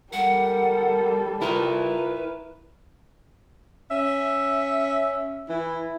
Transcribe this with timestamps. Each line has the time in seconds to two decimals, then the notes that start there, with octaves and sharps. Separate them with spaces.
0.13 G3 A4 A#4 F#5
1.42 E4 F4 A#4 B4
3.91 C#4 E5
5.49 E3 E4